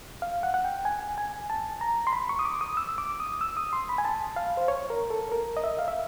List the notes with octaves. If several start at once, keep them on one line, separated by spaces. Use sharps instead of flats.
F5
F#5
F#5
G5
G#5
G#5
A5
A#5
C6
B5
C#6
D#6
D6
D#6
E6
D6
D#6
E6
D#6
C6
B5
G#5
A5
F5
C5
C#5
A#4
A4
A#4
D#5
E5
F5
E5